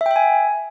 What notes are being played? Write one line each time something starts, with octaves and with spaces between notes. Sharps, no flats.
E5
G5
E5
G#5